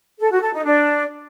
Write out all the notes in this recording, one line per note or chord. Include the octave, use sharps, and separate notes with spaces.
A4
F#4
A4
D#4
D4